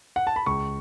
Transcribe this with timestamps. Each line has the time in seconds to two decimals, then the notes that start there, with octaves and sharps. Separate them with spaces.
0.16 F#5
0.27 A5
0.36 B5
0.46 C#2 C#6